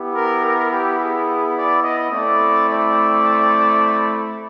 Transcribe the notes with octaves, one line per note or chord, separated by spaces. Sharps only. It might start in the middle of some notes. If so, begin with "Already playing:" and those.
Already playing: B3 E4 G4
A#4
A#4
G4
G#4
D5
D#5
A3 C4 E4 D5
D5